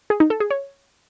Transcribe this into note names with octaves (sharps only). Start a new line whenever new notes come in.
G#4
D#4
A4
G#4
C#5